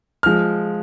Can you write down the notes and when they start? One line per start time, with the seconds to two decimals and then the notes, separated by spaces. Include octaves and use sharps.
0.23 F3 G#3 F6